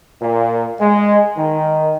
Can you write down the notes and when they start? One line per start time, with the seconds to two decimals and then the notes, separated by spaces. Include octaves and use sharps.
0.21 A#2
0.80 G#3
1.37 D#3